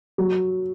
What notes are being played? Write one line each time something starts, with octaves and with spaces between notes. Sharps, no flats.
F#3